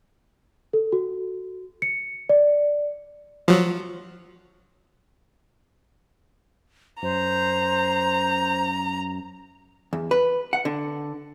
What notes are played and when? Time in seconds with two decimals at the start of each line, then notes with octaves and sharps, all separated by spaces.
0.73 A4
0.92 F#4
1.82 C#7
2.29 D5
3.48 F3 F#3
7.03 F#2 C5 A#5
9.93 E2
10.11 B4
10.53 F#5
10.65 D3